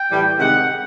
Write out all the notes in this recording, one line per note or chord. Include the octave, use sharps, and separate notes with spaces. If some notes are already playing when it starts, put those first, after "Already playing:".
Already playing: G5
A2 E3 G3
C3 D#3 G#3 F#5